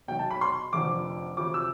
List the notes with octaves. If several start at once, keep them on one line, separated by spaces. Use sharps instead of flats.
B1 B2 G5
A5
B5
C6
F1 F2 D3 F3 D6
D2 C3 F3 D6
E6